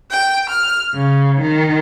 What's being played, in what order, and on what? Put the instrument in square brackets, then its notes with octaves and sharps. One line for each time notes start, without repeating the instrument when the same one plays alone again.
[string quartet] G5
F6
C#3
D#3